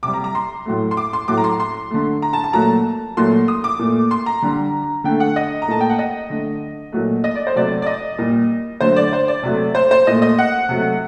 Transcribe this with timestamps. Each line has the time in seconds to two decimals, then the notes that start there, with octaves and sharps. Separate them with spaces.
0.03 C3 G3 D6
0.14 A#5
0.24 A#5
0.35 C6
0.66 A2 F#3 A3
0.91 C6
0.97 D6
1.13 C6
1.28 A2 F#3 A3 D6
1.37 A#5
1.44 C6
1.60 C6
1.90 D3 A3
2.22 A#5
2.33 A5
2.44 A5
2.53 A#2 F#3 A3 A#5
2.61 A5
3.17 A#2 F#3 A3 C6
3.48 D#6
3.64 D6
3.79 A#2 A3
4.11 C6
4.26 A#5
4.42 D3 G3
5.04 D3 A3 G5
5.20 F#5
5.36 D#5
5.62 A#5
5.68 A#2 A3 A5
5.81 G5
5.90 F#5
5.99 D#5
6.30 D3 A3
6.92 A#2 F#3 A3
7.24 D#5
7.35 D5
7.47 C5
7.56 C3 F#3 A3 D5
7.82 D5
7.86 D#5
8.18 A#2 G3
8.80 D3 F#3 A3 C5
8.96 D5
9.13 C5
9.28 D5
9.43 C3 F#3 A3
9.75 C5
9.91 C5
10.07 A#2 A3 D#5
10.22 D#5
10.39 F#5
10.69 C3 F#3 A3